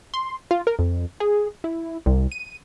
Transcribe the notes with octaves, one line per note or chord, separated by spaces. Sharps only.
C6
F4
A#4
F2
G#4
E4
C2
D#7